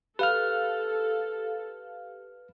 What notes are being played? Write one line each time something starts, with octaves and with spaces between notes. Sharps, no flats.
G4 A4 B4 F5 F6